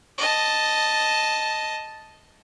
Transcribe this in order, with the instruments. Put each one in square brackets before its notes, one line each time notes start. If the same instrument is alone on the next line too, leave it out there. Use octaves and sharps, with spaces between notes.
[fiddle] D#5 A5